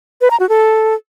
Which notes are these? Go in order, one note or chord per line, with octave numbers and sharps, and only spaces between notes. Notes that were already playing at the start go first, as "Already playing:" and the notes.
B4
A#5
F#4
A4